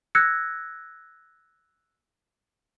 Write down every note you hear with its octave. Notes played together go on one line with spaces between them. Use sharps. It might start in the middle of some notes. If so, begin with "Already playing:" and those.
E6 F#6 G#6 A#6 C#7